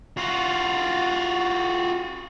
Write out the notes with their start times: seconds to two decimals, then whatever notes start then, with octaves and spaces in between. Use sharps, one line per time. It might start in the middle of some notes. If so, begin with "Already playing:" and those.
0.17 F4 F#4